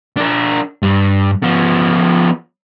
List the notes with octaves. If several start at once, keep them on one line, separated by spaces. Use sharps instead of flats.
D4 A#4
G2
F3 B3